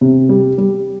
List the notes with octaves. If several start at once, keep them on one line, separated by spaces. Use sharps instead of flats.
C3
G3
G3